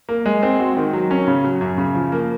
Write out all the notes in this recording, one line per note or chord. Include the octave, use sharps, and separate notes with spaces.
A#3
G#3
C4
F#4
D#3
F#3
C#4
C#3
F#3
F#2
C#3
F3
A#3